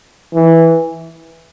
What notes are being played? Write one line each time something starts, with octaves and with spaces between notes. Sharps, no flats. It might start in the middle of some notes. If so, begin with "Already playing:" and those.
E3